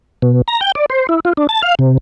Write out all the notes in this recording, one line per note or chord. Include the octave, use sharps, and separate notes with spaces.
B2
A#5
G5
D5
C5
E4
F4
D4
A5
F5
C3